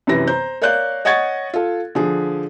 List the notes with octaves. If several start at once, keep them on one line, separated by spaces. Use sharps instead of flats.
F#2 C3 E3 B4 A#6
C5 A#5 G6
A#4 C#5 D5 F5 F#6 G6
C#5 D#5 F#5 C#6 G#6 A6
F4 A4
D3 F3 G#4